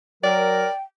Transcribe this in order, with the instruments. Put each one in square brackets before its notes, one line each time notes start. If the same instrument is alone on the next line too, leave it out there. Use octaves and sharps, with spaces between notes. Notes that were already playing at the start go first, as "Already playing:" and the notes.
[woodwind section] F#3 A#4 [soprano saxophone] D5 [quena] G5